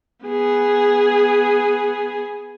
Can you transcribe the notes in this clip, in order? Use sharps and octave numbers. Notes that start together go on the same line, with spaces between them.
B3 G#4